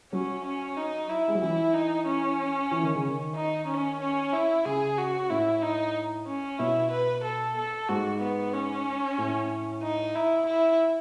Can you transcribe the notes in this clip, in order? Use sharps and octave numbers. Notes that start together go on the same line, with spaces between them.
F#3 C#4
C#4
D#4
E4
G#3
F#3
E3 E4
D#4
C#4
E3
D#3
C#3
D#3
D#4
C#4
C#4
E4
C#3 G#4
F#4
A2 E4
D#4
C#4
B2 E4
B4
A4
A4
G#2 F#4
B3
C#4
A2
D#4
E4
E4